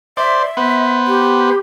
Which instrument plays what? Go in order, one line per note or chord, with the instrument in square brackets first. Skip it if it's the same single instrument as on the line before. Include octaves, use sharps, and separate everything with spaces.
[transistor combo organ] C5 D5 [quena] E5
[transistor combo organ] B3 B4 C5
[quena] G4